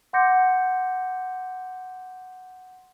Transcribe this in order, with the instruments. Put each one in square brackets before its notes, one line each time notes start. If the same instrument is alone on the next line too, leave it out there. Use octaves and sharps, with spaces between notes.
[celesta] F#5 C6 D6 G6 A#6 C#7